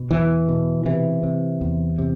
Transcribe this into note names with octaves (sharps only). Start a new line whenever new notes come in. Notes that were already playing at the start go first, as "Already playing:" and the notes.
Already playing: B2
E2 E3
B2
C3 E3
C3
E2
C3